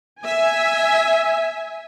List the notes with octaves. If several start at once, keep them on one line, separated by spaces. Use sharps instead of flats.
E5 G#5